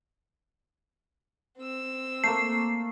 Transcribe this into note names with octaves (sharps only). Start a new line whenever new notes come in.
C4 E6
A3 A#3 C7